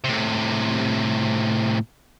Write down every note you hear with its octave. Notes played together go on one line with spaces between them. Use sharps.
A2 C3